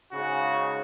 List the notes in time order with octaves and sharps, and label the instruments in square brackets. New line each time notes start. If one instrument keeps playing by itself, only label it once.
[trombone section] G#2 C#3 [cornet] F#4